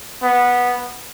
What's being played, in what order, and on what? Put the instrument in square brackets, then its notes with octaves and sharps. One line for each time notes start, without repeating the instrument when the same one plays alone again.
[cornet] B3